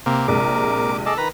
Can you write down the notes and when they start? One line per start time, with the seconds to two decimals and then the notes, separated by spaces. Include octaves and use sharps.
0.06 C3 A#3
0.28 A#1 C3 G#3 A#4 D6
1.06 G#4 A4 D#5 D6
1.18 D#3 B4 A#5 B5